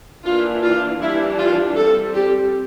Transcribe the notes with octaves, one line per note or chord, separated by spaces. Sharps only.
E3 A#3 D4 F4
F4
E3 G3 D4 E4
F4
G3 C4 A4
G4